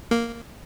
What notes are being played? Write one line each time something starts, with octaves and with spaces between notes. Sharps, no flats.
A#3